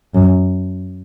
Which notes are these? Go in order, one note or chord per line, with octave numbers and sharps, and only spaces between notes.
F#2